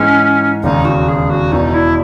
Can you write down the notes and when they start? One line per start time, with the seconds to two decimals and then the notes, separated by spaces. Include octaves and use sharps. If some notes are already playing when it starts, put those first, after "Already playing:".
Already playing: G#2 E3 G#3 C#4
0.62 E1 D#2 C#3 D#4
0.85 F#4
1.08 G#4
1.30 F#4
1.52 E1 E2 B2 D#4
1.74 E4